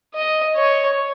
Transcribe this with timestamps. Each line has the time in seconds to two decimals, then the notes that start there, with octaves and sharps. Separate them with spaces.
0.14 D#5
0.56 C#5